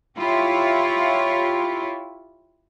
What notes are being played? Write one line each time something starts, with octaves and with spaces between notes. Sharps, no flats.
E4 F4 G4 C#5